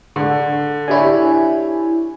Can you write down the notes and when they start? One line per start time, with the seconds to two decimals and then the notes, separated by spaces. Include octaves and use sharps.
0.16 D3
0.88 D4 E4 G4 C#5 G#5